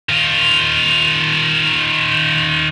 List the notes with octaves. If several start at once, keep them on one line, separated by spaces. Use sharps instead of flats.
D#3 F4